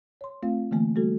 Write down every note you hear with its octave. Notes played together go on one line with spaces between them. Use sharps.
C#5 C6
A3 C4 F4 F5
D3 E3 A3 A#3
G3 A3 B3 F#4 A4